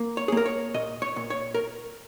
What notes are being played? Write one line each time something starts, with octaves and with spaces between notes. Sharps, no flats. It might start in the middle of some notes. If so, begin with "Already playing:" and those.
Already playing: A#3
C#5
G#4
A#3
A#4
C#5
A#2 D#5
C#5
A#2
C#5
A#4